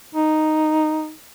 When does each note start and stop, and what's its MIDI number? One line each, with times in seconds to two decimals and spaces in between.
0.15 1.12 63